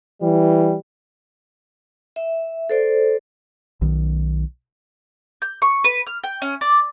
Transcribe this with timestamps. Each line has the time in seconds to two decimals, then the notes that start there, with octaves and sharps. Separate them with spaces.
0.22 E3 G3
2.16 E5
2.69 A4 C5 D5
3.81 B1 D#3
5.42 G6
5.62 C#6
5.84 B4
6.07 F6
6.24 G5
6.42 C#4
6.61 D5